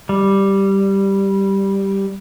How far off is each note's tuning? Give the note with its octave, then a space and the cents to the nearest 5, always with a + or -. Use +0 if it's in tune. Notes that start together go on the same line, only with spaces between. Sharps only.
G3 -5